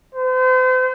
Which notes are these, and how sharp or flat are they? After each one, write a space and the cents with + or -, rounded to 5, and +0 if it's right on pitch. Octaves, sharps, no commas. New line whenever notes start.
C5 -40